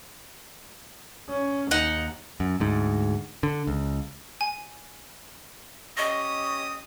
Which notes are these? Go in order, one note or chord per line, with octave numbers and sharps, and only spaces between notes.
C#4
D#2 D#4 F#5
F#2
D2 G#2
D3
C#2
G#5
C#4 G4 D#5 C#6 D#6